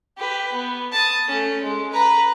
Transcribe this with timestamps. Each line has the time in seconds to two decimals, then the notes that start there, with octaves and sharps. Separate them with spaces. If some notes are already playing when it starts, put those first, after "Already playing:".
0.18 G4 B4
0.53 B3
0.92 A5 D#6
1.27 A3 C#4
1.62 G#3
1.93 B4 A#5